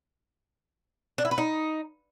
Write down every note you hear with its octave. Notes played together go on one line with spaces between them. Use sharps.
D4
E4
B4
D#4